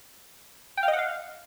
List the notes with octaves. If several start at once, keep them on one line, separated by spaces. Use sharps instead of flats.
G5
F5
D#5
F#5
F5